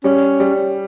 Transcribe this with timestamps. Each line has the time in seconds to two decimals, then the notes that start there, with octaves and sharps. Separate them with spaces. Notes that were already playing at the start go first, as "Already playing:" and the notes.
0.04 G3 C#4
0.40 G3